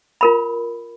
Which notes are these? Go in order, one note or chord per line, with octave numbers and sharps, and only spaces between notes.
F4 A#4 B5